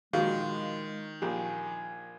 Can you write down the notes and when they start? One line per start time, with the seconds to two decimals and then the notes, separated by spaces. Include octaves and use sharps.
0.13 A#1 D#3 G#3 F#4 G#4 F5
1.22 A#1 G4 G#5